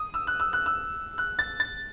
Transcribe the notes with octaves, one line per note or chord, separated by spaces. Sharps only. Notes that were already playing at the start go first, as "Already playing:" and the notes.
Already playing: D#6
E6
F#6
E6
F#6
E6
F#6
A6
A6